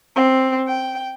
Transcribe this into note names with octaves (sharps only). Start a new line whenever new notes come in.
C4
G5